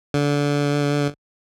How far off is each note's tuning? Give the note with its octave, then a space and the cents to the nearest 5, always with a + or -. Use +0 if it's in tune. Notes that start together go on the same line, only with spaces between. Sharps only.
D3 -25